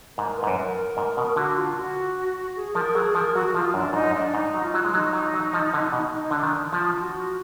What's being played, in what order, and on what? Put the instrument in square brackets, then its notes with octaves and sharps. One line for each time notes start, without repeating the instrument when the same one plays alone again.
[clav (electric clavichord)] G#2 [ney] A#4
[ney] B4
[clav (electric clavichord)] G#2
F#2
[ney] A#4
A#4
[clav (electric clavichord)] G#2
B2
[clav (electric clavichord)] D3 [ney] F#4
[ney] F4
F#4
G#4
[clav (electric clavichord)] F3 [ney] A#4
[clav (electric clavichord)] F#3 [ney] G#4
[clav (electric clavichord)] F3 [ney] A#4
[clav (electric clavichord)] F#3 [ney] F#4
[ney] F#4
[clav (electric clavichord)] F3 [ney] F4
[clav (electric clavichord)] F#2 [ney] D4
[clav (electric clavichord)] G#2 [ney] D#4
[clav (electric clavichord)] F#2
[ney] D4
[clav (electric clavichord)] G#2 [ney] D#4
[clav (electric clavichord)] F#3
[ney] F4
[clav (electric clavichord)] F#3
G#3
[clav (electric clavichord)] F#3 [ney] D#4
[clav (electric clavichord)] F#3
F#3
F3
D3
B2
[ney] D#4
[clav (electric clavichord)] D3 [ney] D4
[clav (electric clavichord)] D#3
[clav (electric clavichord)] F3 [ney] F4
[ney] F#4